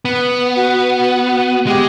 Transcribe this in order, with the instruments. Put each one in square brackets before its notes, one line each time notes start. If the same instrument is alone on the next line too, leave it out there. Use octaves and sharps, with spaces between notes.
[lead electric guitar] B3
[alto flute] F#4
F#4
[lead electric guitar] G#3 [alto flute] G4